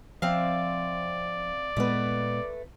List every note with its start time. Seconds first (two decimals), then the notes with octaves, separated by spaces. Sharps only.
0.22 F3 C4 D5 E5 F5
1.77 A#2 G#3 A3 B3 B4